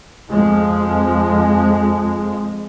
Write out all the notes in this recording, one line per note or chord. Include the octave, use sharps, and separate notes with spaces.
F2 F3 G#3